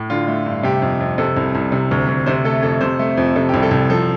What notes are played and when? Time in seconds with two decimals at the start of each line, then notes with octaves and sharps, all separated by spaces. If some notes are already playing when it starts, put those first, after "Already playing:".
Already playing: A2
0.10 D3 F4
0.28 A3
0.46 G2
0.63 C3 G4
0.82 F2
1.00 F2
1.18 C3 A4
1.37 C2
1.55 C2
1.72 C3
1.91 D2
2.08 D2
2.26 C3 C5
2.45 A3 A4
2.63 F2 A4
2.81 C3 C5
2.99 A3
3.17 F2
3.35 C3 A4
3.49 G4
3.54 C2
3.63 A4
3.71 C2
3.90 F3 A4